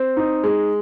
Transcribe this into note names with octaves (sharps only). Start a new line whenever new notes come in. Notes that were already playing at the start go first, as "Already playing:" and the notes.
Already playing: C4
D#4
G#3